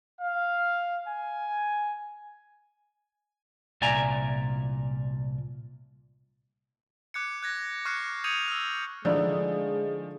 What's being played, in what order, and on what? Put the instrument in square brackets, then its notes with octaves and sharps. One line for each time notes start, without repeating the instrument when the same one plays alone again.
[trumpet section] F5
G#5
[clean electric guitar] C2 A#2 D5 E5 G#5 A#5
[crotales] D6 F#6 G#6 C#7
F#6 G#6 A#6
C#6 F6 F#6 G#6 C7 C#7
D#6 G6 G#6 C#7 D#7 F7
E6 F6
[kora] D3 D#4 E4 [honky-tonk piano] F3 A3 [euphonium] G#3